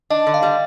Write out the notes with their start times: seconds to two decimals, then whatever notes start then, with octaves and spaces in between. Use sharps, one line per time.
0.10 D4 D#5
0.27 D3
0.34 F5
0.43 G3